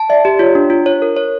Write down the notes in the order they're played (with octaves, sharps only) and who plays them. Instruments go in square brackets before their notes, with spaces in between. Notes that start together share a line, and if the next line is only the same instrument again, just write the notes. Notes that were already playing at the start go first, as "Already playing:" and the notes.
Already playing: [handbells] A5
[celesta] D5 [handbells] E5
[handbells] G4
[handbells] F4 [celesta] C#5
[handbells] D4
F4
C#5
A#4
C#5